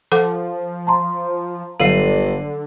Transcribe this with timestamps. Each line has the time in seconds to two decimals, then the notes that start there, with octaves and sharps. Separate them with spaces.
0.12 F3 A4 F#5 D6
0.87 A5 A#5 C6
1.80 G1 D3 F#3 F5 C7 D#7 F#7